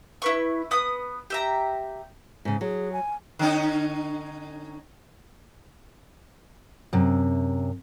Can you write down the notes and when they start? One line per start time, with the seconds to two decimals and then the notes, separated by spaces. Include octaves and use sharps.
0.22 E4 B4 C#6
0.71 B3 D#6
1.30 G4 E5 A#5
2.45 G#2 C#3
2.61 F#3 G#4
2.93 G#5
3.39 D3 C#4 D#4
6.93 F#2 C3